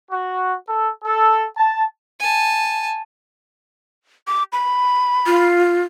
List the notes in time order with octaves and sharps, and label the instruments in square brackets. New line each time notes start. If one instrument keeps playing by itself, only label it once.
[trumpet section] F#4
A4
A4
A5
[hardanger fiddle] G#5 A5
[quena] D6
B5
[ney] F4